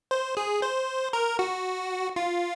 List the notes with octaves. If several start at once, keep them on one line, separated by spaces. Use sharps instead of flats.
C5
G#4
C5
A#4
F#4
F4